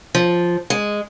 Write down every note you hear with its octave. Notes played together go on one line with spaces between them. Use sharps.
F3
G#3